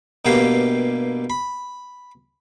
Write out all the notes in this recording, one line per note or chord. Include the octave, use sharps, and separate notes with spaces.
G2 B2 A#3 E4 G4 F5
B5